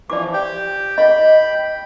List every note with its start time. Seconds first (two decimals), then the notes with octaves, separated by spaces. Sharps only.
0.10 E3 F3 D5 D6
0.33 G4 G5
0.98 D#5 G5 B5